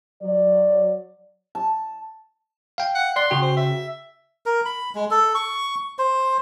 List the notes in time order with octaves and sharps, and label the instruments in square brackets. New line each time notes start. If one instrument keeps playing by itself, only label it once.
[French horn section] F#3 D5
[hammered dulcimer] A5
[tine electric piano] F5 G5
[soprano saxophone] F#5
[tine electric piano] D5 F#6 [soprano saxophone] C6
[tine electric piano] C#3 F#4 G5
[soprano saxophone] C5
E5
[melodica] A#4
B5
G#3
A4
C#6
C5